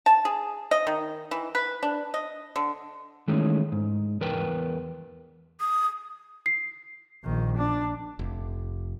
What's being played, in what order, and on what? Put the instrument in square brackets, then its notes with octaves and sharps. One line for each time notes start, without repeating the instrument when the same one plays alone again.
[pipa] A5
G#4
D#5
D#3
E3
B4
D4
D#5
D3
[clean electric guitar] D#3 E3 G#3 A3 C#4
G#2
E2 A#4 B4 G5
[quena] D#6
[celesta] C7
[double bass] A#1 D#3
D4
[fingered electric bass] F1